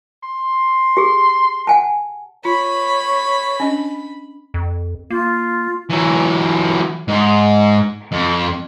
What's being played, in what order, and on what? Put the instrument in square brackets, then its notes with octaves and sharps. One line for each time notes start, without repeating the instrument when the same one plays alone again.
[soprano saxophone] C6
[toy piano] G4 G#4
F#5 G#5 A5
[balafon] F4 [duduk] C#5 [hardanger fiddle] B5
[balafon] C#4 D4 D#5
[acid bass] F2
[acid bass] A#3 [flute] F4
[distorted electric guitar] E3 F#3
G#2
F2